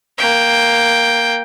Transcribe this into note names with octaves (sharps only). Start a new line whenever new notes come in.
A#3 G5